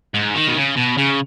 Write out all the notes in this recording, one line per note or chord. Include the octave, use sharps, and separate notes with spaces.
G#2
D#3
B2
C#3
B2
C#3